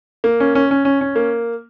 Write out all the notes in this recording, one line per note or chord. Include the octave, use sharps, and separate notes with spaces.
A#3
C#4
C#4
C#4
C#4
C#4
A#3